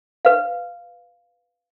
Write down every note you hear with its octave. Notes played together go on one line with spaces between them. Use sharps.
B4 F5